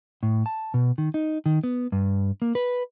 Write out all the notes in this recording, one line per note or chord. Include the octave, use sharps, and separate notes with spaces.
A2
A5
B2
D#3
D#4
D#3
B3
G2
A#3
B4